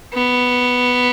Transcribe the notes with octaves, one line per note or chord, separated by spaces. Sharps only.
B3